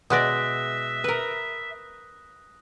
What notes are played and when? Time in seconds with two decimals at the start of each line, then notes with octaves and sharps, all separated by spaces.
0.10 B2 G#3 D5 E5 D#6 F#6 A#6
1.04 A#4 B4